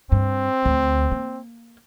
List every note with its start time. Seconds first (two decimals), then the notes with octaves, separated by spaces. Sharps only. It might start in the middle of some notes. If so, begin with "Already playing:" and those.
0.12 G2 C4
0.65 D2
1.11 A#3